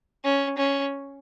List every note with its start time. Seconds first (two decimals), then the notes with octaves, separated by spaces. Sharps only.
0.24 C#4
0.58 C#4